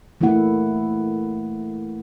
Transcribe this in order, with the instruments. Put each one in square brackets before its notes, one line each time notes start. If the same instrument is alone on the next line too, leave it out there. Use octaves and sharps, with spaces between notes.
[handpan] E3 A3 A#3 E4 F#5